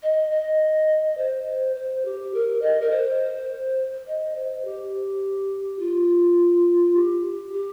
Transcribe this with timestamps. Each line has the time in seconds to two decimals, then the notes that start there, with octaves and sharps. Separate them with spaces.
0.03 D#5
0.31 D#5
1.17 C5
1.75 C5
2.05 G4
2.34 A#4
2.62 D#5
2.81 A#4
2.91 C5
4.07 D#5
4.35 C5
4.65 G4
5.79 F4
6.96 G4
7.53 G4